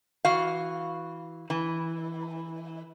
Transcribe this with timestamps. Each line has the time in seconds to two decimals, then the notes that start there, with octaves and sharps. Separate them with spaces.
0.25 E3 F#4 F5
1.50 E3